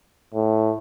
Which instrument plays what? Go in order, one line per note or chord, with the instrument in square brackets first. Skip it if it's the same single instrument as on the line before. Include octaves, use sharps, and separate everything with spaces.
[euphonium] A2